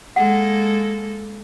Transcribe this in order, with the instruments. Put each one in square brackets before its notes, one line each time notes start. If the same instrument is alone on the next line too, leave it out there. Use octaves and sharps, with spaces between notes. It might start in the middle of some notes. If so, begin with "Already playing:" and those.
[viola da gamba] G#3 A#3 A4 [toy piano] F#5